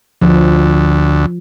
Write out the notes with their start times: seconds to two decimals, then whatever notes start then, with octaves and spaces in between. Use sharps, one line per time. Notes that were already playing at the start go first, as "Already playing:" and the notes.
0.22 D2 F3